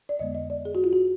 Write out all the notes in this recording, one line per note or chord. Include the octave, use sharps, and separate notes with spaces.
D5
F2 D3 G#3 B3 D#5
D#5
D5
G#4
F#4
F4
F#4